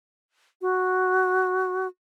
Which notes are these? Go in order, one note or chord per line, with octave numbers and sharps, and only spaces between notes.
F#4